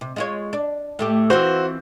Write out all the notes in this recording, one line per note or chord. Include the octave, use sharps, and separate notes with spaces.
C3
G#3 F4 C#5
D4
A2 A3 G4
E3 C4 F4 F#4 C5